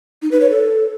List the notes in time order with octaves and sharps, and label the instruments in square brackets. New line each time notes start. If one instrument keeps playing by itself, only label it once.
[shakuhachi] D#4
B4
C#5
A4